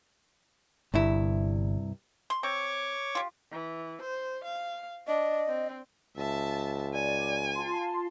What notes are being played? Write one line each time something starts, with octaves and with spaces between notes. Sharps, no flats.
G1 C2 G2 E4
C6
C4 C#5 C#6 D6
F4 G4
E3
C5
F5
D4 D#5
C4
C#2 E5 A5
D5 G#5
F4 A5 C6